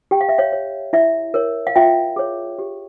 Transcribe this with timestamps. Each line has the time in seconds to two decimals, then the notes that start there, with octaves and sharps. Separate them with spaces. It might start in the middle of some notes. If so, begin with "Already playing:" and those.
0.11 G4 G5
0.21 F5
0.29 E5
0.38 C#5 F5
0.52 C#5
0.93 E4 E5
1.34 A#4 C#5
1.67 F5
1.76 F4 E5 G5
2.16 G#4 C#5
2.59 G4